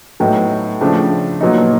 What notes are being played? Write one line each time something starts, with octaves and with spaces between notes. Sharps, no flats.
A2 F#3 B3 D#4
C#3 F3 A3 D4
A#2 F#3 B3 D#4